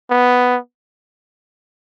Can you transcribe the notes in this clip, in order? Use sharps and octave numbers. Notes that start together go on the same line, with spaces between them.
B3